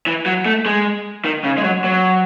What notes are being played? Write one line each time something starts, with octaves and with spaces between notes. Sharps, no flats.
E3
F#3
A3
G#3
D#3
C#3
G#3
F#3
F#3